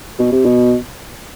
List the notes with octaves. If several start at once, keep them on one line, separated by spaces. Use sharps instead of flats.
B2
C3
B2